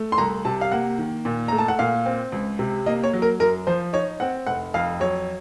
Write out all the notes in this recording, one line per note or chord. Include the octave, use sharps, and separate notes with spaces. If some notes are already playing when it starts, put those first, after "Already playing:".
Already playing: A3
C6
C2 A#5
C3 A5
F5
A#3 F#5
D#3
A#2
A3 A#5
A5
F#5
A#2 F5
C4
C#2
C3
A#3 D#5
C#5
F#3
A#4
F#2 A#4
F3 C5
D#4 C#5
C4 F#5
F1 F#5
F2 F5
F#3 C#5